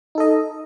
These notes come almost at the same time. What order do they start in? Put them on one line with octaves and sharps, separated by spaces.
D#4 A4 D#5